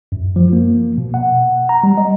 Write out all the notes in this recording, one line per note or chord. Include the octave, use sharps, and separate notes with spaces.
F#2
F3
A#3
B2
F#5
A#5
G3
D#5